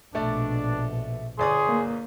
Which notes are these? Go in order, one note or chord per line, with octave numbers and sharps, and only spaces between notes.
A#1 B2 A3 D4 D5
G1 G#4 D5 C6 C#6 D#6
A#3